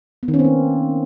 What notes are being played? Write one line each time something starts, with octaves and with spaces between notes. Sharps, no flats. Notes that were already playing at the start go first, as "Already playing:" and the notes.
B3
D#3
C#4
C4
A#3